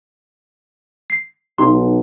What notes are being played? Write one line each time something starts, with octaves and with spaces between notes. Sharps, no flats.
C7
B1 D#4 G4 C6